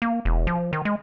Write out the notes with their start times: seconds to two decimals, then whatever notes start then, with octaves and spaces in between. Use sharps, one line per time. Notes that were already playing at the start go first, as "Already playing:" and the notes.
0.02 A#3
0.25 E1
0.47 F3
0.73 D#3
0.85 G#3